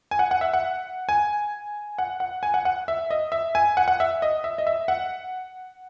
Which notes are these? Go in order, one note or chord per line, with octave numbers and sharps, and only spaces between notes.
G#5
F#5
F#5
E5
F#5
G#5
F#5
F#5
G#5
F#5
F#5
E5
D#5
E5
G#5
F#5
F#5
E5
D#5
E5
D#5
E5
F#5